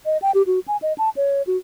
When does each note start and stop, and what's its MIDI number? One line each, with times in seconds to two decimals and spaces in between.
0.06 0.17 75
0.22 0.31 79
0.35 0.42 67
0.47 0.59 66
0.68 0.77 80
0.82 0.93 75
0.98 1.09 81
1.17 1.42 73
1.47 1.57 66